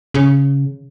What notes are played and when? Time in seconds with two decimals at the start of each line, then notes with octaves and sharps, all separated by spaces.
0.14 C#3